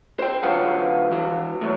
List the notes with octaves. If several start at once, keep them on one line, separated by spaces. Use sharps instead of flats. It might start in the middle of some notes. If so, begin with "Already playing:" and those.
C5 G5
D3 F#3 F4 B4 F5 F#5
E3 F#4
A2 F#3